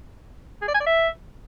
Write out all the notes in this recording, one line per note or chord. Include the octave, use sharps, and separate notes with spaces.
G#4
D5
G#5
D5
E5